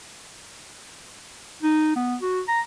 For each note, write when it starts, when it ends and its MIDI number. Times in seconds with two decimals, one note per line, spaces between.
1.63 1.92 63
1.96 2.16 59
2.21 2.41 66
2.48 2.61 82